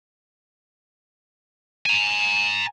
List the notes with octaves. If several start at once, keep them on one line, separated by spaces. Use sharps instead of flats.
G#5 A#5